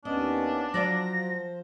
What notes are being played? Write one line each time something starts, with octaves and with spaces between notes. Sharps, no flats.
D#2 B3 C#4 D4 D#5
F3 F#3 C5 D5 F5 A#6